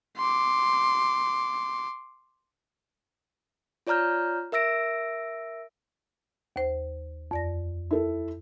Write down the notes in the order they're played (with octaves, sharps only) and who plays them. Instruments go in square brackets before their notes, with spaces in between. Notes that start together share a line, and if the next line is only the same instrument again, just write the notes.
[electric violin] C6 D6
[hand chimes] F4 C#5 D5 A#5 F6 G6
A#4 E5 E6 A#6 D7
[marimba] D#2 C5
F2 D5 A#6
[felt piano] E4 A4